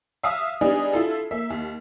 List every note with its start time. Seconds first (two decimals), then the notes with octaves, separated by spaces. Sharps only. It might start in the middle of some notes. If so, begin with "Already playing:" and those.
0.23 E5 F5 D#6 F6
0.61 G3 B3 D4 D#4 G#4
0.93 E4 F4 A4
1.31 A#3 E5
1.50 D#2